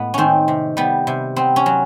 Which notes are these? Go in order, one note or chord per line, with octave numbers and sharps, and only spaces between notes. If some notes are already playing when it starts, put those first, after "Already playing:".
Already playing: A2 G#3 B3
D#3 C4 C#4
C3
G3 B3
C3
B3 C4
C#4
F#3